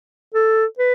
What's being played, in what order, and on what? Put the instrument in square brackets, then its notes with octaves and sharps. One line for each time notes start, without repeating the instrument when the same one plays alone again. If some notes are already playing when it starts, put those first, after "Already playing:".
[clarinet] A4
B4